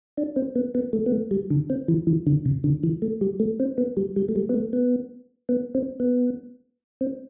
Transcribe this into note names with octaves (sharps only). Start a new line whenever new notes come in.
D4
C4
B3
B3
A3
B3
A3
G3
D3
C4
E3
E3
D3
C3
D3
E3
A3
G3
A3
C4
B3
G3
G3
A3
G3
B3
A3
B3
B3
C4
B3
C4